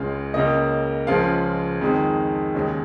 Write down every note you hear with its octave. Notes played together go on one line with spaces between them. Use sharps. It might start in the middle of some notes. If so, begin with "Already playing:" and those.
Already playing: C#2 C#3 G#3 F5
C#2 C#3 A#3 D#5
C#2 C#3 F3 G#3 F5
F2 D#3 G#3
D#2 C#3 G#3